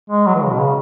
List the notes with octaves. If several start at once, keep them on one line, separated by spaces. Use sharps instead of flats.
G#3
F#3
E3
C#3
B2
C#3